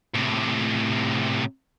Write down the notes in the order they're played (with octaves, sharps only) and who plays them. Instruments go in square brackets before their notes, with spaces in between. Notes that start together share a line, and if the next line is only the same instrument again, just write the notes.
[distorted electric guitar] A2 C3